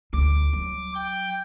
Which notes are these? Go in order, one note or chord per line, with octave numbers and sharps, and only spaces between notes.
D2 D6
F#3
G5